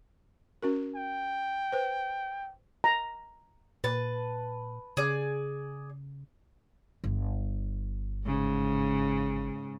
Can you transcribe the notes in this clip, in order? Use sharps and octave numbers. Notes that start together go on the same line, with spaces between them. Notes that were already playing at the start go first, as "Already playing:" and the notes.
C#4 F#4 A#4
G5
B4 C5
A#5
A#2 B4 A5
C#3 G#4 D5
G1
G#2 C#3